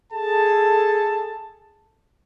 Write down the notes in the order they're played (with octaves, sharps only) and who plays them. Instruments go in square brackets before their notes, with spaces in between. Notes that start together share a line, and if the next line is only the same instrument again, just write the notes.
[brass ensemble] G#4 A4 A5